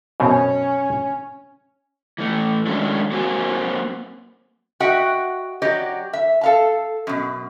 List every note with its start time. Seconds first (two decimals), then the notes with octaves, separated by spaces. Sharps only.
0.20 F#2 B2 C4 C#4
2.18 E3 A3
2.66 D#3 F#3 G#3 A3 C#4 D4
3.12 F#3 A#3 C4 F#4 A#4 G#5
4.80 F#4 D#5 E5 F#5 G5
5.62 F#3 G4 D5 D#5
6.13 E5
6.41 A4 F5 A5
7.07 F#2 B2